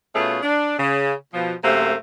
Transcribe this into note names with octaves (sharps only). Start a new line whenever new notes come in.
B2 A3 C#4 F4 G#4
D4
C#3
B2 F3
F#2 C3 A3 A#3 C5